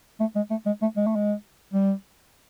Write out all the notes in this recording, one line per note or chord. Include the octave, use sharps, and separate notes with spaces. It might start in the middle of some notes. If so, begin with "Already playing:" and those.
A3
G#3
A3
G#3
A3
G#3
A3
G#3
G3